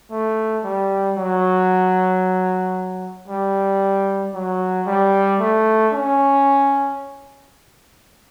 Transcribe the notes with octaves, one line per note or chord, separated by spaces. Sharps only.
A3
G3
F#3
G3
F#3
G3
A3
C#4